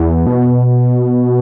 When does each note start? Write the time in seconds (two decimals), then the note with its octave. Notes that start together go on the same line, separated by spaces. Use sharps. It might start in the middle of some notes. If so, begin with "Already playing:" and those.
Already playing: E2
0.26 B2